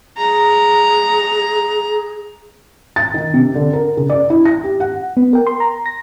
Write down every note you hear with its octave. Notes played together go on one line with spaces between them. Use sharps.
G#4 A#5
A6
D#3
C3
D3
A#4
C#3
D5
E4
A#6
G4
F#5
B3
A#4 G5
C6
A#5
A#6